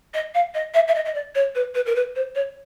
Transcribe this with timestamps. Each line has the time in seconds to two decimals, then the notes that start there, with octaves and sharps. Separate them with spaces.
0.14 D#5
0.35 F5
0.55 D#5
0.74 E5
0.88 E5
0.95 D#5
1.05 D#5
1.14 D5
1.35 C#5
1.55 B4
1.75 B4
1.86 A#4
1.96 B4
2.16 C5
2.35 C#5